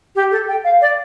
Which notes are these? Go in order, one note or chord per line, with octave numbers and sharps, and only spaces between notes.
G4
A4
G5
F5
D5